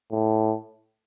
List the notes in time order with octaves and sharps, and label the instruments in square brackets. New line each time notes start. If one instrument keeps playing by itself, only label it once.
[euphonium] A2